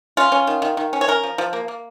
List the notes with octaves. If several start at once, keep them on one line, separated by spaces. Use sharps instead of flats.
C#4 F4
C#4
D#3
D#3
D#3
C#4
C#5
C#4 A#4
F3
F3
A#3
A#3